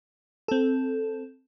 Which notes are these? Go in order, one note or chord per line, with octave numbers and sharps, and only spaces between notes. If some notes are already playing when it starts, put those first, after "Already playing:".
C4 A4